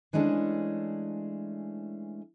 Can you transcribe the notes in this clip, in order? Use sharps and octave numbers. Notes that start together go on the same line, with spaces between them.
E3 G#3 A3 C#4 D4